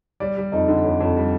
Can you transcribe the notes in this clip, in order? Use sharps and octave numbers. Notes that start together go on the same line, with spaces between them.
G3 D5
G3
F2 D#4
D3
F2
F2
G3